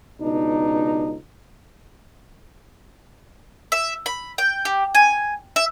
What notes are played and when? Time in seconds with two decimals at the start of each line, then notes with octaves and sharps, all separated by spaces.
0.20 C#2 B2 D4 D#4
3.72 E5
4.06 B5
4.38 G5
4.65 G4
4.95 G#5
5.56 E5